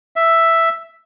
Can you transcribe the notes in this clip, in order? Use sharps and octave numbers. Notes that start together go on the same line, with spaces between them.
E5